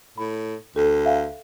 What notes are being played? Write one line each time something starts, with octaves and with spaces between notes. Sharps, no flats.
A2 B5
D2 A4
E5 F5 G5